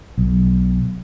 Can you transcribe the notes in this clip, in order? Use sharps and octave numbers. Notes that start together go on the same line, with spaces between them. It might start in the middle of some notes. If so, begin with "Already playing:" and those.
B1